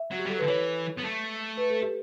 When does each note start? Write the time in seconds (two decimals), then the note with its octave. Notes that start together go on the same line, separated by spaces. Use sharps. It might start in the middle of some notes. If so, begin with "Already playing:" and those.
Already playing: E5
0.11 F#3
0.19 G4
0.26 G3
0.29 F#3 A4
0.39 D3 B4
0.47 E3 C#5
0.98 B3
1.03 A3
1.57 B4
1.70 A4
1.82 G4